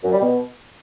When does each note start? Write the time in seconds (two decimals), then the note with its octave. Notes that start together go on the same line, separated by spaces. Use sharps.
0.04 F#2
0.13 G3
0.22 B2